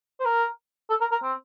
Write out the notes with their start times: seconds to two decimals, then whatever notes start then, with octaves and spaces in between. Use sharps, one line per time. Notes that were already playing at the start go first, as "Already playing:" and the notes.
0.20 C5
0.25 A#4
0.90 A4
1.01 A#4
1.12 A#4
1.23 C4